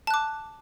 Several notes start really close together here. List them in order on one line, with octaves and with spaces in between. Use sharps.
A5 F#6 D6